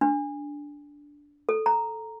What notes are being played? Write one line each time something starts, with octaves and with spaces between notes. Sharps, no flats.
D4
A4
A#5